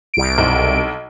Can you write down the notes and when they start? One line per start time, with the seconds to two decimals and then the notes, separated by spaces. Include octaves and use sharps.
0.14 C2 D7
0.38 B1